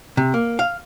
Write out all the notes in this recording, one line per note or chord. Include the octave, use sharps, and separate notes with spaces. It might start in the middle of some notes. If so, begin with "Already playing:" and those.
C3
A#3
F5